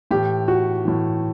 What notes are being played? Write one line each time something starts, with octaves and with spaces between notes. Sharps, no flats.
A2 E3 G4
F#4
A2 E3